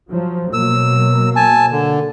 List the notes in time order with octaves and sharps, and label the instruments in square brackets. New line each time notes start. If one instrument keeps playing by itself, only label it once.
[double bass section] F3 F#3
[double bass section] B2 F#3 A#3 [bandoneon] E6
[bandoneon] G#5 A5
D3